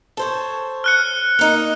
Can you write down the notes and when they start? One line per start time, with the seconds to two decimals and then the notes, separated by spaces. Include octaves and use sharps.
0.17 A4 C5 C#5
0.84 F6 F#6 C#7
1.39 A#3 D#4 A#4